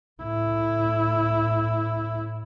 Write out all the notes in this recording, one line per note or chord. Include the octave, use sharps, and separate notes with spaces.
A2 E4